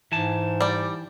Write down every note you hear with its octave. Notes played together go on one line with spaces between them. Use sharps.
G#2 E3 A5
G3 D5